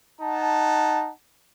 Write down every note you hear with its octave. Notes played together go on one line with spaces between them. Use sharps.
D#4 F#5 A5